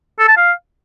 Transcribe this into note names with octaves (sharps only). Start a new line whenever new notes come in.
A4
A5
F5